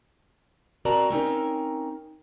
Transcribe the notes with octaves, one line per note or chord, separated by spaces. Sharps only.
C4 F#4 A#4 D5 A5 A#5
C4 C#4 D#4 A#4